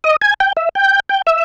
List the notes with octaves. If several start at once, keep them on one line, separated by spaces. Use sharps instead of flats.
D#5
G#5
G5
E5
G5
G5
E5